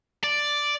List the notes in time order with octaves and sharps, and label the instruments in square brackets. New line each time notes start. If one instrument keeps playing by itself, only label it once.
[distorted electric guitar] D5